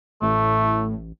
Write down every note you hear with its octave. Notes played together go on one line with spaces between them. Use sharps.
A1 A2 A3